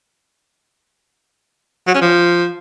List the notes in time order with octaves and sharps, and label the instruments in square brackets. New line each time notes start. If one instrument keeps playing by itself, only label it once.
[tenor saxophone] F#3
C#4
F3